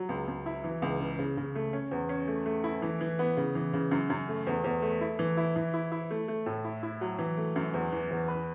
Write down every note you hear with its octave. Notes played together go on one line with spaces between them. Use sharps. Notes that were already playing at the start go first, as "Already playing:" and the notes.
Already playing: F#3
C#2
C#2
E4
E3
C#2
C#3
C#3
C#3
A3
C#4
E2
C#4
A3
A3
E4
E3
E3
B3
C#3
E3
C#3
F#2
F#2
A3
E2
E2
A3
E4
E3
E4
E3
E4
E4
A3
A3
A2
E4
E4
F#3
E3
A3
F#2
E2
E3
E2
B4